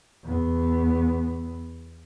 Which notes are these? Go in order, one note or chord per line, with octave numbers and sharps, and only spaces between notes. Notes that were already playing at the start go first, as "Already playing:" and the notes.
E2 B3